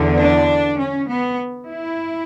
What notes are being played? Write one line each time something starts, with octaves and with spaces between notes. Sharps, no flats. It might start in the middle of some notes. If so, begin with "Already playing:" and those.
Already playing: E2 D3
D4
C#4
B3
E4